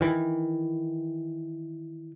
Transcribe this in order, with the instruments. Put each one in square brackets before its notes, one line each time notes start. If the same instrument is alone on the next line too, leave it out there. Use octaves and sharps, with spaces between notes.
[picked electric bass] D#3 E3